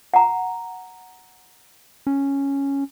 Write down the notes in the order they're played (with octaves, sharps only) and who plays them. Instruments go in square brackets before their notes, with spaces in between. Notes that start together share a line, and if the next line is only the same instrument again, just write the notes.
[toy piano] F#5 A#5
[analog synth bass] C#4